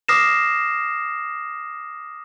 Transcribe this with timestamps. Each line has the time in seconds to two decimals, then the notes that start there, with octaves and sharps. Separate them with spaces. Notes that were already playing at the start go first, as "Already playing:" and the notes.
0.08 D6 D#6 F6 A#6 C7 E7